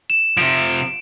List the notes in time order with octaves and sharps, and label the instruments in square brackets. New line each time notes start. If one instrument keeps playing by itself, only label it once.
[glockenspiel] E7
[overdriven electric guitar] C3 F3 [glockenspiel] D7